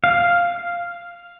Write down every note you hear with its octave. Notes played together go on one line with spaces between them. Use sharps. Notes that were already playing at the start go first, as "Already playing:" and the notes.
F5